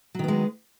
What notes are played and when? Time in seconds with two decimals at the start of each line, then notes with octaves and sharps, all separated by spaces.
0.15 F#3
0.19 D#3
0.24 B3
0.28 G#3